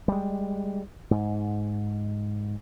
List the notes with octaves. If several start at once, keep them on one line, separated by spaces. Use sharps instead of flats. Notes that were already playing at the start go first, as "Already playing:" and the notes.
G3 G#3
G#2